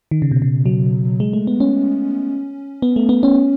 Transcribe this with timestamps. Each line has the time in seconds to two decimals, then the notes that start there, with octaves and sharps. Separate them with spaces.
0.11 D#3
0.22 C#3
0.32 B2
0.42 C#3
0.66 F#3
1.20 G#3
1.33 A3
1.47 B3
1.60 C#4
2.82 B3
2.96 A3
3.09 B3
3.23 C#4